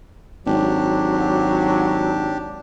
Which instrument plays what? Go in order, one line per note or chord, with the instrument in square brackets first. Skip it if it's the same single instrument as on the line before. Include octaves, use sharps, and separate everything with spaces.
[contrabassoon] G#1 [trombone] F#3 [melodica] D4 G4